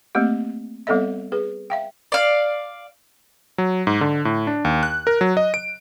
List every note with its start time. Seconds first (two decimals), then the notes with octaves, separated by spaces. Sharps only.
0.15 A3 A#3 C4 G4
0.87 G3 B3 C4 A4 D#5 E5
1.32 G#4 B4
1.70 E5 F5 G5
2.12 D5 F5
3.58 F#3
3.87 G#2
4.01 D3
4.25 A2
4.47 D4
4.65 D#2
4.83 F#6
5.07 A#4
5.21 F#3
5.37 D#5
5.54 D7